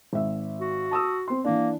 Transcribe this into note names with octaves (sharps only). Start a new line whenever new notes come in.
G#1 E5
F#4
A5 D#6 E6
C4 C6
E3 A#3 D4